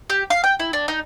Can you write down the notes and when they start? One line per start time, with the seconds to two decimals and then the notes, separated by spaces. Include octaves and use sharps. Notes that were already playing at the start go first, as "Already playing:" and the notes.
0.10 G4
0.30 F5
0.44 G5
0.60 E4
0.73 D4
0.88 D#4